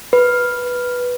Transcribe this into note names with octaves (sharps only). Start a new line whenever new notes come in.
B4